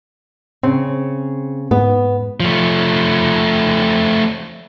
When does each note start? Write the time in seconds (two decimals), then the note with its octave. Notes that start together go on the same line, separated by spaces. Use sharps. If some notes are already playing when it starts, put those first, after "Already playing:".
0.63 C#3 C4
1.71 G#2 B3
2.40 F3 A3